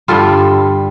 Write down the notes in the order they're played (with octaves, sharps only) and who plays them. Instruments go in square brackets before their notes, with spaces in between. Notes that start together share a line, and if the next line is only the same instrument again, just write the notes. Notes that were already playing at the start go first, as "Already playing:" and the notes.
[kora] G2 D3 G3 F4 A4